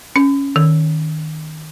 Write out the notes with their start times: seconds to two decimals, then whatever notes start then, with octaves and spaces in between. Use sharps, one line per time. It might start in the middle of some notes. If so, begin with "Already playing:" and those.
0.16 C#4
0.56 D#3